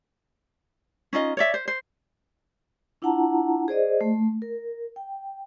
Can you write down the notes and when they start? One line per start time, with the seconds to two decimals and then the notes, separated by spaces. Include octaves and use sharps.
1.13 C#4 D#4 F4 D#5
1.37 C#5 D5 E5
1.54 C5
1.68 C5
3.02 D4 E4 F4 F#5 A5 A#5
3.68 G#4 C5 D5 D#5
4.01 A3
4.42 A#4
4.96 G5